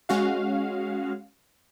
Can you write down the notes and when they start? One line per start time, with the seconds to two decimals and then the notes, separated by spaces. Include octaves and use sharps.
0.09 G#3 C#4 F#4 F5